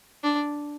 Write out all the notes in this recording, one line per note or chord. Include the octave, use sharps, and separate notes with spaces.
D4